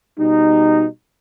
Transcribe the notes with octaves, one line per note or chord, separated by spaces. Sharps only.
B2 G3 D#4